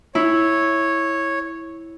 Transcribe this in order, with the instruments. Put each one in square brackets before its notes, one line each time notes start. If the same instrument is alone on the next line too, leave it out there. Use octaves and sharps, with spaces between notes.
[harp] E4 [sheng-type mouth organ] C#5